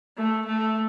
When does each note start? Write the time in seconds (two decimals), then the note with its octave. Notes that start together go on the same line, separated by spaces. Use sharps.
0.18 A3
0.46 A3